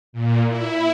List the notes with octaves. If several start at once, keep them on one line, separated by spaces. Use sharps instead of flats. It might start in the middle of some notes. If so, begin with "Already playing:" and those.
A#2
E4